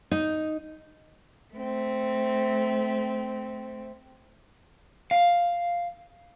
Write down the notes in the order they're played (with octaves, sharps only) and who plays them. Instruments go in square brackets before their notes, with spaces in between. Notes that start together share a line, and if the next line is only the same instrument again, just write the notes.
[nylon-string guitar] D#4
[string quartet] A3 C4
[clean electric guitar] F5